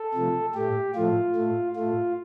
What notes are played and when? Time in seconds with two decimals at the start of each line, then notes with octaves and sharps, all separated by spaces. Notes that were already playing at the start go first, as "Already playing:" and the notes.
Already playing: A4
0.14 C3 F3 A3
0.54 A2 A3 G4
0.95 A2 F3 A3 F4
1.35 A2 A3
1.76 A2 A3 F4